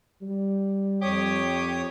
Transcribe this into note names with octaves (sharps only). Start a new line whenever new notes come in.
G3
F2 G4 C#5 D#6